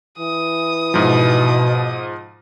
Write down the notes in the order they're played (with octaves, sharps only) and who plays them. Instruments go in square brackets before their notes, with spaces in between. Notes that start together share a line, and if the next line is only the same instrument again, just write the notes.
[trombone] E3 [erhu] D#6
[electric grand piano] G#2 F3 [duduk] B2